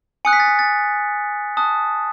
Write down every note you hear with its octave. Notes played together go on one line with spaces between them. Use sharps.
G#5 D#6 F#6 C#7
B6
A6
B6
A6
A5 D#6 F#6